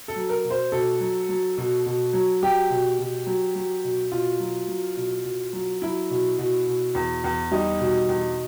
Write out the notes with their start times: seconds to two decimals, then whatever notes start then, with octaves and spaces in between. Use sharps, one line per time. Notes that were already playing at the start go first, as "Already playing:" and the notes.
0.08 A4
0.16 F#3
0.30 A#4
0.44 B2
0.50 C5
0.72 B2 A4
1.00 F#3
1.29 F#3
1.58 B2
1.86 B2
2.13 F#3
2.42 F#3 G4
2.70 B2
2.99 B2
3.26 F#3
3.56 F#3
3.84 B2
4.12 B2 F4
4.40 F#3
4.68 F#3
4.97 B2
5.25 B2
5.53 F#3
5.82 F#3 E4
6.10 B2
6.38 B2
6.67 B2
6.95 E2
7.24 E2
7.51 G3 D#4
7.80 B2
8.09 E2